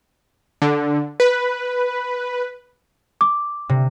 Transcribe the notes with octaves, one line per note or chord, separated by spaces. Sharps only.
D3
B4
D6
C3